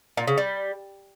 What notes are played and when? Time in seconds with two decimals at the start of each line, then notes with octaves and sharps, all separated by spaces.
0.17 A#2
0.27 C#3
0.38 G3